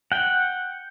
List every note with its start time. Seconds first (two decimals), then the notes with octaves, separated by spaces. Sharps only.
0.12 F#5 G5